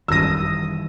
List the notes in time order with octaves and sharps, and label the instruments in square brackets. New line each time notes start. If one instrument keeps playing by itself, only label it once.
[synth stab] G#1 F#2 D#6 [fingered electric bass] D#3 E3 G3 [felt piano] E6 A#6